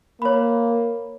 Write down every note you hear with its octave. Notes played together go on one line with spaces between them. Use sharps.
A#3 C#5 B5